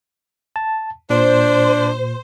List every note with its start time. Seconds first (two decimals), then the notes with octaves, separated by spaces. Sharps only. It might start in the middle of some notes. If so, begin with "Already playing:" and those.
0.56 A5
1.10 A#2 D4 C5